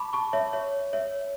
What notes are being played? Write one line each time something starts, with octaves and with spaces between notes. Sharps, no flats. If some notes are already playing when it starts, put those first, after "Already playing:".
Already playing: A5 B5 C#6 D6
A5 C#6
C#5 E5
C#5 E5
C#5 E5